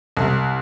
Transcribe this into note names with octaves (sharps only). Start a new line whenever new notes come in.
C2